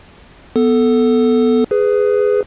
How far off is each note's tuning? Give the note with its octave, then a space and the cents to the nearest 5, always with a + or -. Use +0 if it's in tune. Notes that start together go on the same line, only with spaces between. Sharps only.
B3 +0 A4 +0
G#4 +0 B4 +20